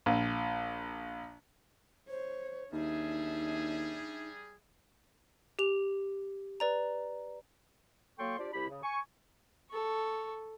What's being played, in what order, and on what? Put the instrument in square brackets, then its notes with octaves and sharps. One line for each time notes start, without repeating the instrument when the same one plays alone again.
[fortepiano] A#1
[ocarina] C5 [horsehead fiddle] C#5
[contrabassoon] D#2 [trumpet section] G3 G#4 [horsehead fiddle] D4 E5 [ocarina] D#4
[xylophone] G4 F7
B4 D5 A#5
[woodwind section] F#3 A#3 A4 G5 C6 C#6
D4 F4 G4 C5 D5
C2 E4 G4 B5
C#3
G#5 C#6
[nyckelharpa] A4 C#6